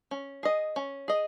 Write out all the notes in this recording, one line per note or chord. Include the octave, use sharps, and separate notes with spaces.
C#4
G#4 D#5
C#4
G#4 D#5